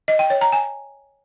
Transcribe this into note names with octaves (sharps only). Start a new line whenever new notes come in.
D#5
G5
C#5
A#5
G#5